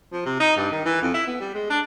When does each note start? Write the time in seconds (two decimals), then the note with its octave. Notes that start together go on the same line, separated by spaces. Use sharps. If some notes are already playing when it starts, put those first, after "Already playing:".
0.12 F3
0.25 C3
0.40 D#4
0.57 G2
0.72 D#3
0.85 E3
1.01 F2
1.14 E4
1.27 B3
1.40 G3
1.54 G#3
1.70 D4